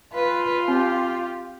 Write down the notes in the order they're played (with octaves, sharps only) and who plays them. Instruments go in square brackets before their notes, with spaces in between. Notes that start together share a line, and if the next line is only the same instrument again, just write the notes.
[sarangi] F4 [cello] B4
[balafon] C4 [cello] G4